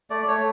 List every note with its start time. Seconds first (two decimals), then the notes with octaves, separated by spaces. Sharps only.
0.10 A3 D5
0.28 A3 C#5